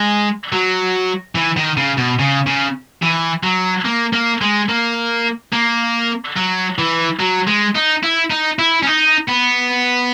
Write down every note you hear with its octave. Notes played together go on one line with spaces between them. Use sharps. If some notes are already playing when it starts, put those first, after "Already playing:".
Already playing: G#3
F#3
E3
D#3
C#3
B2
C#3
C#3
E3
F#3
A#3
A#3
G#3
A#3
A#3
F#3
E3
F#3
G#3
D#4
E4
D#4
E4
C#4
D#4
B3